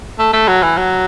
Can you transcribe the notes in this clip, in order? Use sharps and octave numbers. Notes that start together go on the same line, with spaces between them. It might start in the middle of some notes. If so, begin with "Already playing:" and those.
A3
A3
F#3
E3
F#3